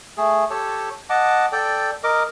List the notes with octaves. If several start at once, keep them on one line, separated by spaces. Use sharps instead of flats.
A3 G#4
G4 A4 C#5 A5
D#5 F#5 A5 D6
A4 D5 G5
A#4 D#5 D6